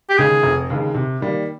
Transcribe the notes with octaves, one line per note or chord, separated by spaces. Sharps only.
G4
D#2 C#3 G#3 G#4
F1
D#2 C#3 G#3
C3
D#3 G3 A#3